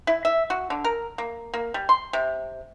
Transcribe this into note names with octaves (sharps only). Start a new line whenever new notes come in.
E4
E5
F#4
D3
A#4
A#3
A#3
G3
C6
C3